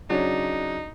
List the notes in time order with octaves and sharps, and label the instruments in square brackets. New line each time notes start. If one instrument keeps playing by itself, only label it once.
[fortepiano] C#3 F#3 D4 [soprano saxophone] D#4